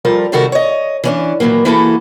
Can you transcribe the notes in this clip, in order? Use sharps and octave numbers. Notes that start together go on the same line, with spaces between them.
F3 G3 F4 A4 A#4
C3 D#3 G3 F#4 A4 A#4
C#5 D#5
E3 C#4 D4
A#2 D#3 E3 F#3 A#3
E3 A#3 E4 F#4 G#4 A4